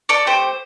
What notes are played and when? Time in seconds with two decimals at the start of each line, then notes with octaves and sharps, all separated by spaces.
0.09 A4 D5
0.26 A3 C4 G4 C5